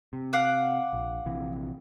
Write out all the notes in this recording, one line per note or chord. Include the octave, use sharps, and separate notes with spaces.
C3
F5 F#5 D6
A#1
A#1 C3 E3